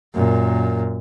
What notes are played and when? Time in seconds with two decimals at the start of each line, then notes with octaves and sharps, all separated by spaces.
0.15 F#2 A#2